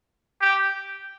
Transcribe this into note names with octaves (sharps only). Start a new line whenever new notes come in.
G4